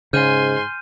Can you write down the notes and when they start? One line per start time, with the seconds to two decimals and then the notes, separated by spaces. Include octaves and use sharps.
0.13 G#2 C#3 G#5 C6 F6 G6 D#7